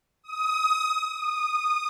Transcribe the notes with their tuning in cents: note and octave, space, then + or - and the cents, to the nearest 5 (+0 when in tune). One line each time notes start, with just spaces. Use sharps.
D#6 +25
D#6 -15